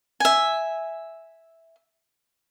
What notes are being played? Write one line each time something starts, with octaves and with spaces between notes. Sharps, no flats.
E5 G#5